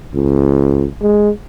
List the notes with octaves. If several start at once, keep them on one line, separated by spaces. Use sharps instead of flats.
C#2
G#3